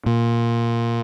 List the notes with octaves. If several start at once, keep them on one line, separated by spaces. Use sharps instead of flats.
A#2